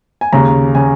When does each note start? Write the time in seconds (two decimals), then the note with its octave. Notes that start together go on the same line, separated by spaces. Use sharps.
0.21 G#5
0.33 D#2 C#3 A#5
0.75 C#3 G#5